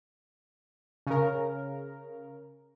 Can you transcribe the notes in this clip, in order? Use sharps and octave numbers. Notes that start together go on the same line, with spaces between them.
C#3 A#4